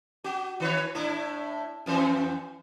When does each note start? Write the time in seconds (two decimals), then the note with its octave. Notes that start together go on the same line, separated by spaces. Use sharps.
0.24 F#4
0.60 D#3 B4 C#5
0.95 A2 D4 E4
1.86 F2 E3 C5